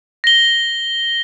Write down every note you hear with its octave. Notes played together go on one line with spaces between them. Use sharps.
A#6 G7